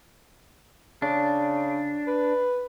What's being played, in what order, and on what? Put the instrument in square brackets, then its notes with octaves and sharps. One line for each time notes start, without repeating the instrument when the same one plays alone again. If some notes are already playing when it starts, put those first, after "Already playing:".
[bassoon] C#3 [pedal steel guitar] D4
[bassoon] B4